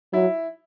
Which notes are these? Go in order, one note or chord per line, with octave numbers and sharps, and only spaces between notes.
F#3 E4